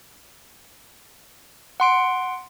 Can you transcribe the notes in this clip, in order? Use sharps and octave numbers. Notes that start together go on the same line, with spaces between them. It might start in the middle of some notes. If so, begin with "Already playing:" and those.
F#5 C6 D7